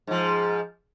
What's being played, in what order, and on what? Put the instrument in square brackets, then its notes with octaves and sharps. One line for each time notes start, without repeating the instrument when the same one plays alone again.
[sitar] G#2 F3